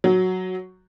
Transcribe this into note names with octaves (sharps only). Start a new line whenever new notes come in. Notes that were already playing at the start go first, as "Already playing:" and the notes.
F#3